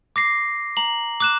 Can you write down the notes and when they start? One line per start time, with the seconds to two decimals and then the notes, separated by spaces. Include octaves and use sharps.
0.16 D6 A#6 C7
0.77 A#5 F#7
1.20 D6 F#6 E7